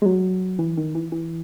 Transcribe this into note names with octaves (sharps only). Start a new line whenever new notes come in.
G#3
F#3
E3
D#3
E3
E3